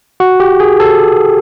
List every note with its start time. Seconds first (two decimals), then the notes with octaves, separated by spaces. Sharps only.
0.20 F#4
0.40 G4
0.60 G#4
0.80 A4